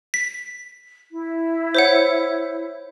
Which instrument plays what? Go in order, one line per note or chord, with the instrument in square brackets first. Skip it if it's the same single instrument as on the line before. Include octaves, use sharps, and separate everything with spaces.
[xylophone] B6
[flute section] E4
[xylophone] C5 C#5 F#5